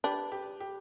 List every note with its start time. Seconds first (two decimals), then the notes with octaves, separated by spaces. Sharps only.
0.04 D4 G4 B4
0.32 G4
0.60 G4